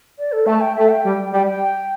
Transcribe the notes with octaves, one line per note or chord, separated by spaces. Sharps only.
D5
A4
A3 A5
G5
A3 E5
G5
G3
G3 G5
G5